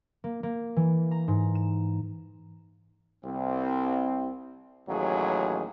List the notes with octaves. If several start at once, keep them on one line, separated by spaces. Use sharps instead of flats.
A#3
A#3
E3
A#5
G#2
E7
C2 C4
A1 D#2 F#3 G#4